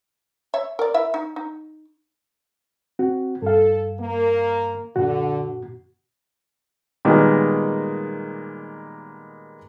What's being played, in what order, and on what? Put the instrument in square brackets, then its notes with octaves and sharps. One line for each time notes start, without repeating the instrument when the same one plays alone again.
[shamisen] C#5 E5
A#4 D5
E4 A#4 E5
D#4
D#4
[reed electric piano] C4 F#4
[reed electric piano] G2 F5 [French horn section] A4
[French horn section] A#3
[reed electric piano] F#2 A#2 F#4 [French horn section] D3
[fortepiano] A#2 D#3 G3 G#3 A#3 B3